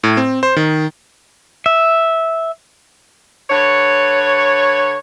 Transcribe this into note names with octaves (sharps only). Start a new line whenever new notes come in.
A2
C4
C5
D#3
E5
D3 B4 C#5